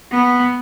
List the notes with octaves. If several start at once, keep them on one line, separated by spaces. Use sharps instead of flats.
B3